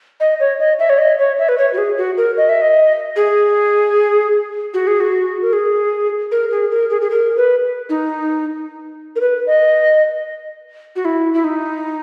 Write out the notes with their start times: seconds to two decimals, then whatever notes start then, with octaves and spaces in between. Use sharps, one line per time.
0.20 D#5
0.40 C#5
0.60 D#5
0.79 E5
0.90 C#5
0.98 D#5
1.19 C#5
1.39 E5
1.49 B4
1.58 C#5
1.73 F#4
1.78 G#4
1.97 F#4
2.18 A#4
2.37 D#5
2.49 E5
2.61 D#5
3.16 G#4
4.74 F#4
4.87 G#4
5.00 F#4
5.42 A#4
5.53 G#4
6.32 A#4
6.51 G#4
6.71 A#4
6.90 G#4
7.01 G#4
7.11 A#4
7.37 B4
7.89 D#4
9.16 A#4
9.21 B4
9.47 D#5
10.96 F#4
11.05 E4
11.34 E4
11.44 D#4